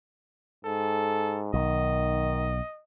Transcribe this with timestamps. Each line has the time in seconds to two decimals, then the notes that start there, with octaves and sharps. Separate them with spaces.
0.65 G#2 A4
1.54 B1 D#3 D#5